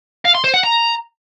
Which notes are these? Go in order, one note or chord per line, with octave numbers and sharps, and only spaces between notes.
F5
C6
C5
F#5
A#5